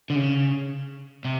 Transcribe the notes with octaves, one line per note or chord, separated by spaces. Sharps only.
D3
C#3
C3